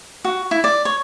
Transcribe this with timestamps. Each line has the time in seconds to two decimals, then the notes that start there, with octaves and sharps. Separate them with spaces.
0.25 F#4
0.51 E4
0.64 D5
0.85 C#5